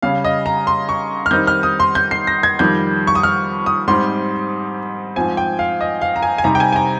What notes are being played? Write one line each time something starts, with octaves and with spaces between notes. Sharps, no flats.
C#3 G3 C#4 F5
D#5
A#5
C6
C#6
F6
D#3 G3 C4 D#4 G6
F6
D#6
C6
G6
C7
A#6
G#6
F2 D#3 G3 G6
C#6
D#6
F6
D#6
G#2 G3 C4 D#4 C6
G#2 F3 C4 G#5
G5
F5
D#5
F5
A#5
G#5
G#5
C3 G3 C4 D#4 A#5
G5
G#5
G#5
A#5